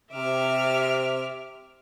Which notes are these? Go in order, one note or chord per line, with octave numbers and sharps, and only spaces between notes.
C3 E5 D6 F6